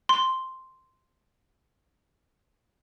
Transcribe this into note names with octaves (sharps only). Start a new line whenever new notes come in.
C6